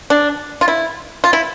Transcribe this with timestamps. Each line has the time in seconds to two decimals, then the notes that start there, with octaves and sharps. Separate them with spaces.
0.10 D4
0.61 F4
0.68 E4
1.24 F4
1.33 E4